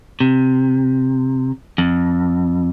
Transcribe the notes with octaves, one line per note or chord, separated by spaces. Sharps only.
C3
F2